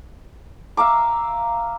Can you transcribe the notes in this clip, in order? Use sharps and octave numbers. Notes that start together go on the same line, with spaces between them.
E5 F5 A#5 D6